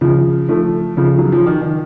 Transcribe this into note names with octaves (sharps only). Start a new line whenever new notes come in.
C#3 F3
F3 A3
C#3 F3
F#3
F3
D#3
D#3